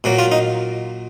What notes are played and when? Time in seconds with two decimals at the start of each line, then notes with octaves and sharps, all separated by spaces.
0.04 A#2 F#3 A#3
0.19 F4
0.32 D#4